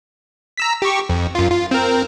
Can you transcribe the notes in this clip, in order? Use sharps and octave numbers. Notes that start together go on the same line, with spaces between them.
A#5 E6 B6
G4 C#6
F2
F#2 F4
F4
C4 A#4